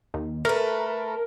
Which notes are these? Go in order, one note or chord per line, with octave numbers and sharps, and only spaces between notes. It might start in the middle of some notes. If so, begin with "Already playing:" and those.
D#2
A3 A#4 B4